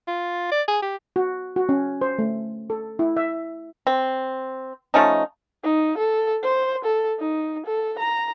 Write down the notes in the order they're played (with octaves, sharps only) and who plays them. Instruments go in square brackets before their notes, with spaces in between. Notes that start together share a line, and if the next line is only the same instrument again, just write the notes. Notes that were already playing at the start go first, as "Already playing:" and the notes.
[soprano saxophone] F4
D5
G#4
G4
[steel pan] F#4
F#4
C#4
C5
A3
A4
E4
E5
[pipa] C4
F3 A3 C#4 D#4
[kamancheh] D#4
A4
C5
A4
D#4
A4
A#5